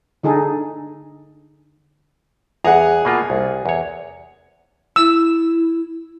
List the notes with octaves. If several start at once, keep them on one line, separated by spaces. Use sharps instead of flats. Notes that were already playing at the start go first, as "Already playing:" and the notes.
D3 D#4 G#4 A4
E2 G#4 F#5 A#5
B2 A#3 F4
C2
E2 C#5
E4 E6